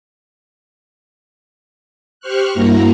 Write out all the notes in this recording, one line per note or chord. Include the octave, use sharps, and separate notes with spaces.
G4 C5 C#6 F6 F#6
G2 A#3 E4 F#4 A#5